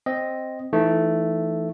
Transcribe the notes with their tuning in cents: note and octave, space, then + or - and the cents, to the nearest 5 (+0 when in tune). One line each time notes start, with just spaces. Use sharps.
C4 +0 D#5 +0
E3 +20 A3 +0 D#4 +0